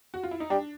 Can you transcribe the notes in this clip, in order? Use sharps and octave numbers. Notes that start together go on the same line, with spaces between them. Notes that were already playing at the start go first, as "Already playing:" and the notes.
F#4
F4
E4
D#4
G3 D4